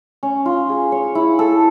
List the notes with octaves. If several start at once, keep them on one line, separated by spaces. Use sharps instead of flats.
C#4
F4
G#4
C#5
E4
A4